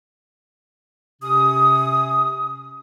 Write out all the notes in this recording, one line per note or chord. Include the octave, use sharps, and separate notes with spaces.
C3 C#4 D#6